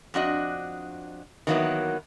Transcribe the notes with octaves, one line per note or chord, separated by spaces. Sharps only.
F2 D4 F#4 D#5
D#3 E3 F#3 A#3 B3